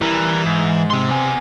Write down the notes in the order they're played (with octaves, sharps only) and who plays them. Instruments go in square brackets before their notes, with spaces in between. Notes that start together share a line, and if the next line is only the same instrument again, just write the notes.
[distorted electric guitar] E3 [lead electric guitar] G3 A#4
[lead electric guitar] G#2
[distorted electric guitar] C3 C6
[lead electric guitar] B3 G#5